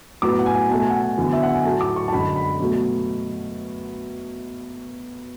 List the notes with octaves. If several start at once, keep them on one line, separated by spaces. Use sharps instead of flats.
A2 F#3 B3 D6
F#5
G#5
B2 A3 A5
G#5
F#5
G#5
E2 D3 F#3
E5
F#5
G#5
A2 F#3 A3 A5
D6
C#6
A5
F#2 D3 G#3 B5
B5
B2 F#3 A3